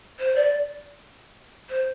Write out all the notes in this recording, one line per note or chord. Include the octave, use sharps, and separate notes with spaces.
C5
D5
C5